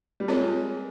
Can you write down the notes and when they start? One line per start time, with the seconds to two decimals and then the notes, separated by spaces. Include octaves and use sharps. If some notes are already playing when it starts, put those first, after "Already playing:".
0.20 G3
0.28 G#3 C4 F4 A#4 C#5